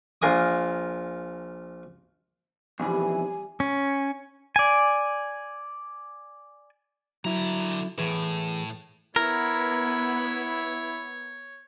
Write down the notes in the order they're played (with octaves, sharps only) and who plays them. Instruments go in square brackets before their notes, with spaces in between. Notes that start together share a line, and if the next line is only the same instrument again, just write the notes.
[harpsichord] A#1 F4 A#4 G#5 D#6
[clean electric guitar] B1 F2 [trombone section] E3 [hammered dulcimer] G3 [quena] G#5
[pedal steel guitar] C#4
D5 G#5
[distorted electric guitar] D3 A#5 [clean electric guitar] F#3 E4
[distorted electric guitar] A2 [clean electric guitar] E3 G#4 B4
[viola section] B3 [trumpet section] E4 [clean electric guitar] A#4 [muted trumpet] C#5